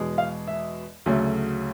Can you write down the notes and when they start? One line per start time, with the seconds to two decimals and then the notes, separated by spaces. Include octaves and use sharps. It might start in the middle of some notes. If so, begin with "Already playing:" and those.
Already playing: E2 B2 G#3
0.18 F5
0.47 E5
1.06 D2 C#3 F#3 A3